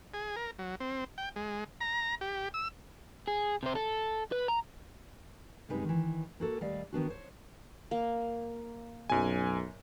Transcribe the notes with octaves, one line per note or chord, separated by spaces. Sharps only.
G#4
A#4
F#3
C4
G5
G#3
A#5
G4
E6
G#4
C3 C5
A4
B4
A#5
F#2 C3 G3 G#3 D#4 B4
D#3 E3
A#3 F#4 A4
D#2 G3 A3 D5 D#5 F5
D#3 B3 D4 F#4
C5 C#5
A#3
B1 F#2 G#5